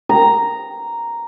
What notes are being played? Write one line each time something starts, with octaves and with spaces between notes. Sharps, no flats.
A#5